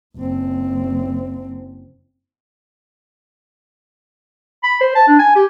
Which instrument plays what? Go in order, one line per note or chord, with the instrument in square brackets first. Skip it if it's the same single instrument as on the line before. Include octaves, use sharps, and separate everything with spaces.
[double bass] F#1 C4
[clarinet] B5
C5
A5
D4
G#5
G4